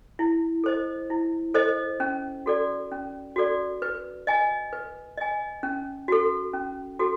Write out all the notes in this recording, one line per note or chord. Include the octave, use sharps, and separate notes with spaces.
E4
A4 C5 D#5
E4
A4 C5 D#5
C#4
F#4 A4 D5
C#4
F#4 A4 D5
B4
D#5 G#5
B4
D#5 G#5
C#4
F#4 A4
C#4
F#4 A4